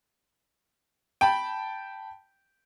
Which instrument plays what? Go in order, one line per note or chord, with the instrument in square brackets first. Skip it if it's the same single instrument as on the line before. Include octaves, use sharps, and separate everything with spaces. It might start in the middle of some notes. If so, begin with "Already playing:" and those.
[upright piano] G5 A5 B5